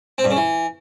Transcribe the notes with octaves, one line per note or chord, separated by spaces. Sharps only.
C4
G2
C#3
E3